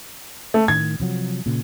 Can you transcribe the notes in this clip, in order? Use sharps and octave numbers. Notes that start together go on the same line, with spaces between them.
A3
A2 D#3 G#6
C3 F3 F#3
A#2 C#3